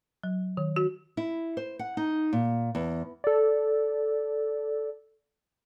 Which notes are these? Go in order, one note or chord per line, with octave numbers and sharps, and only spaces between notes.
F#3
D#3
F#4
E4
C5
F#5
D#4
A#2
E2
A4 D5